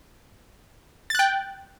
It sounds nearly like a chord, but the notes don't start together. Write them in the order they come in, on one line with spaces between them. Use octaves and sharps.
A6 F#6 G5